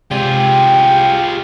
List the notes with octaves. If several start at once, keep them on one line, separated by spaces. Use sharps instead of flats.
C3 G#3 F4 G4 G#4 D5 G5